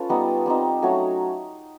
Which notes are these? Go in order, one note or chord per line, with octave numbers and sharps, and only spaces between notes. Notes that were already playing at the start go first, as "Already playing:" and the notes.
Already playing: C#4 F4 A4 B4
G3 B3 D#4
G3 C4 D#4
F#3 A3 C#4 F#4